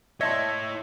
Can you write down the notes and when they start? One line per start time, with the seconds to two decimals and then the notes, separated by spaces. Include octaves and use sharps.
0.21 E4 C#5 D#5 E5 A5 C6 G#6